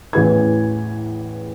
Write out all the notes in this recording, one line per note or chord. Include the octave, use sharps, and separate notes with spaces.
A1 E2 E3 G#4 B4 G#6